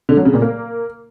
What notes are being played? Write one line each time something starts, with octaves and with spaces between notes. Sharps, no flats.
D3
F#3
C#3
A#2
A#3